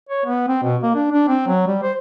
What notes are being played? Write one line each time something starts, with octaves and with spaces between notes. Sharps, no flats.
C#5
B3
C4
B2
A#3
D4
D4
C4
F#3
G3
C5